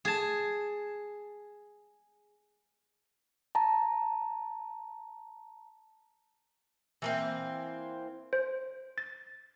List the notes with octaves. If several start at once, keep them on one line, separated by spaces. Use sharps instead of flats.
G#4 A5
A5 A#5
E3 A#3 C4
C5
A6